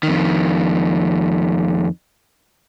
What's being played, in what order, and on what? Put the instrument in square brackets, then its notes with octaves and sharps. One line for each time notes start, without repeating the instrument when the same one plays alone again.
[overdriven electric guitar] F2 D#3